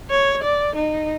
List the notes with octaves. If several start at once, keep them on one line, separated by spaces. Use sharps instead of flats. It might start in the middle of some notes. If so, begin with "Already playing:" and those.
C#5
D5
D#4